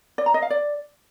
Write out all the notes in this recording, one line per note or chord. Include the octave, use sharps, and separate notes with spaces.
D5
A#5
D#5
F5
D5